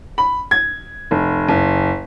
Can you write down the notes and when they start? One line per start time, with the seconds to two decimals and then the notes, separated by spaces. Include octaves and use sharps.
0.18 B5
0.51 G#6
1.11 F1
1.48 F#1